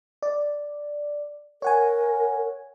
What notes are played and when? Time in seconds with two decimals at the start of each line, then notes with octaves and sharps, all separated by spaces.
0.22 D5
1.62 A#4 C#5 F#5 G#5